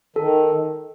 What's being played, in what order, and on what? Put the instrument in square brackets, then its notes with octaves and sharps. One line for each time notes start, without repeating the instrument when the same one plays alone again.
[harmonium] D#3 [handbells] A4